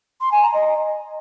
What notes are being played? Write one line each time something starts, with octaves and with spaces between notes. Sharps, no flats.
C6
G#5
A#5
D#5